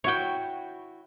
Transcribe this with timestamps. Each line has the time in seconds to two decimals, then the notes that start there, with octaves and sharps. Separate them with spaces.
0.04 E4 F#4 C#5 G5